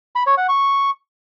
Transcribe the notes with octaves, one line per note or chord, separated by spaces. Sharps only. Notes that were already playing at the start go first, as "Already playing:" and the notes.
B5
C#5
F#5
C#6